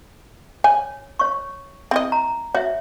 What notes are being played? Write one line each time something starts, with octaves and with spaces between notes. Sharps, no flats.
C#5 G#5
C#5 C#6
C4 E4 D#5
A#5
F#4 C#5 E5